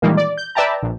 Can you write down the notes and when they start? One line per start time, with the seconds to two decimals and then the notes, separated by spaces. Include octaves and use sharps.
0.02 A#2 D#3 E3 G3 G#3 A#3
0.17 D5
0.37 G6
0.55 B4 D5 E5 G5 A5 A#5
0.83 A#1